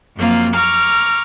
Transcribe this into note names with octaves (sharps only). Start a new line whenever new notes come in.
F#2 F3 F#3 A#3 C4 F4
A#5 C#6 D6 F6